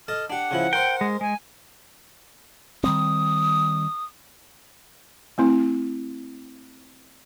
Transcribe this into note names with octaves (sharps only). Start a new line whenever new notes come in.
A4 D#5 A5 F6
D4 G4 F#5
C#3 F3 E4
A#4 C5 G5
G#3
G#3 G#5
D#3 G3 C4 D#6
A3 C4 E4